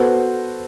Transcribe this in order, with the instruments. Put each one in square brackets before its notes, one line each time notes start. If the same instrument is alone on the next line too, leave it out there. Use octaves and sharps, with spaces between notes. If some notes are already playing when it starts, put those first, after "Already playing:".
Already playing: [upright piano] B3 F#4 A4 C5